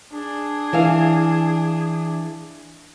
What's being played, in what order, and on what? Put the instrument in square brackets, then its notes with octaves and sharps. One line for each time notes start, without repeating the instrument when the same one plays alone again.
[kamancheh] D4 G#4
[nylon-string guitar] E3 E5 F5